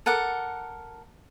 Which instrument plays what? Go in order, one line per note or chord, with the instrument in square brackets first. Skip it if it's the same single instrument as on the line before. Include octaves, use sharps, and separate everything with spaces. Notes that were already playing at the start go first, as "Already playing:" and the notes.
[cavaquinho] A4 A#4 F#5 D6